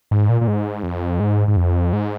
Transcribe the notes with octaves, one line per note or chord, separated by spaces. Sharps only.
G#2
A#2
A#2
G#2
F2
G#2
G#2
F2
G#2